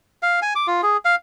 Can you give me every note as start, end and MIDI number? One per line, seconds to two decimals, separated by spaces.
0.23 0.40 77
0.42 0.54 80
0.55 0.67 86
0.67 0.81 65
0.83 0.97 68
1.05 1.15 77